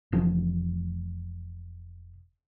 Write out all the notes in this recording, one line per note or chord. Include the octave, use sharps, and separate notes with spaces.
F1 C#3 E3 F3